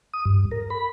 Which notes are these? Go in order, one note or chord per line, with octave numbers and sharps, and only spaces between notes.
D#6
G2
A#4
B5